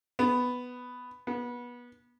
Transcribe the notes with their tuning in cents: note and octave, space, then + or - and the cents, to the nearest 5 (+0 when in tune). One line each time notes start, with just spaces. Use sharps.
B3 +5
B3 -25